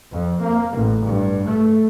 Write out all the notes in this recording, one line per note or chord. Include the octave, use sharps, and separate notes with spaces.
F2
A#3
A1
G2
A3